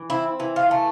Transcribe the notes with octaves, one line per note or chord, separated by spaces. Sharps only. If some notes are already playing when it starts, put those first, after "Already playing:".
Already playing: E3
C4 E4
E3
F4
A3